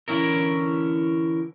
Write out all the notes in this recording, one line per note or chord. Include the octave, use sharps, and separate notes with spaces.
D3 E3 C#4 E4 A#4